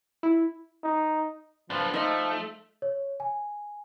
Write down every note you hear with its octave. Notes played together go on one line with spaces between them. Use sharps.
E4
D#4
F3 B3 D4
F3 A3 D#4 D#5
C#5
G#5